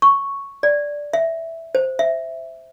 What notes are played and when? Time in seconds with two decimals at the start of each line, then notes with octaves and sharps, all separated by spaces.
0.02 C#6
0.63 D5
1.13 E5
1.75 C5
1.99 E5